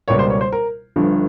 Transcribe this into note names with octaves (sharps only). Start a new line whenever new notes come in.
C#2 B2 G3 A#3 C#5
C5
C#5
C5
A#4
G1 G2 D3 F3